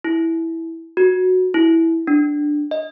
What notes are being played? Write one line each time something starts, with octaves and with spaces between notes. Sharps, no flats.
E4
F#4
E4
D4
D#5